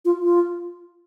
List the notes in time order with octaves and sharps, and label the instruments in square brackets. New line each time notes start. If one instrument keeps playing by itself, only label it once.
[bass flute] F4
F4